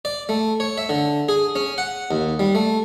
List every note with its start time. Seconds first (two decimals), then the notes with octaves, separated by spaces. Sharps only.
0.05 D5
0.29 A3
0.60 C#5
0.78 E5
0.89 D3
1.29 G#4
1.55 C#4
1.78 F#5
2.11 D#2
2.39 G3
2.55 A3